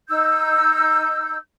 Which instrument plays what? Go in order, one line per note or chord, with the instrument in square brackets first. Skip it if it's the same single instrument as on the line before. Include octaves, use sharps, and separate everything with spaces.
[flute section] D#4 E6 G6